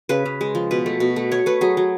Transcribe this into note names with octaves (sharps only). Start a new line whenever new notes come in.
C#3 B4
C#3
G#3
F3
B2 B4
A3
B2
A3
A3 C#5
A3 B4
F#3 G#4
F#3